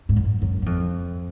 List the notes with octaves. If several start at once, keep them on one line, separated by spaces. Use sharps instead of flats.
G#2
F#2
F#2
F#2
F2